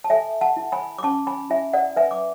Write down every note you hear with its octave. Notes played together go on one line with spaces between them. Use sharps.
A5
A4 E5 G#5
F#5 A5
E4
G#5 B5
D6
C#4 A5 C#6
G#5 B5
E4 E5 G#5
D5 F#5
B4 E5 G#5
D6